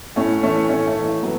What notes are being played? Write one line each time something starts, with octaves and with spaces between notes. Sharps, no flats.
A2 A3 C#4
E3 A3 C#4
A2 A3 C#4
A3
E3
A3
A2 F#3 B3